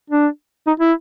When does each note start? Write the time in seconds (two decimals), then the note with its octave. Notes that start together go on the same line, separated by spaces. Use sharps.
0.10 D4
0.67 D#4
0.80 E4